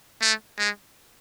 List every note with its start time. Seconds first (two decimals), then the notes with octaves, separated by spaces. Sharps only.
0.22 A3
0.58 G#3